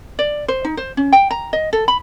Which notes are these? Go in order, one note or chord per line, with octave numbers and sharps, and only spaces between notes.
D5
C5
D#4
C5
C#4
G5
A#5
D#5
A4
B5